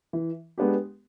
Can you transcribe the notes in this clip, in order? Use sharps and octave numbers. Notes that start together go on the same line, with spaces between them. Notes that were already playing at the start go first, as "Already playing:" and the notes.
E3
G#3 B3 D4 G4